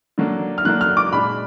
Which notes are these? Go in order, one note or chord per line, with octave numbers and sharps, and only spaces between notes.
D3 F#3 A#3 D4
F6
D3 F#3 A#3 D4 F#6
F6
D6
A#2 G#3 D4 B5